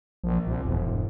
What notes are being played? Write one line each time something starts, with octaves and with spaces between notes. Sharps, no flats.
A#1 F3
C2 A#2
E1 E2
G2